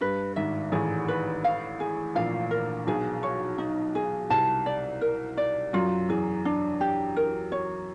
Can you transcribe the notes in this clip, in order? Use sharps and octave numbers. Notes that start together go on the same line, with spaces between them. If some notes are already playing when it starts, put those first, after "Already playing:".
G2 B4
G#1 G#2 E5
A1 A2 G#4
B4
F5
G#4
A#1 A#2 F5
A#4
B1 B2 G#4
C#5
D#4
G#4
C2 C3 A5
D5
A#4
D5
F#2 F#3 F4
E2 E3 G#4
D4
G4
A#4
C#5